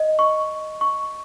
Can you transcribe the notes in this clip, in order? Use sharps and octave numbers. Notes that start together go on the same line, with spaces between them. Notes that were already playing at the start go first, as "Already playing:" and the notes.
Already playing: D#5
C#6
C#6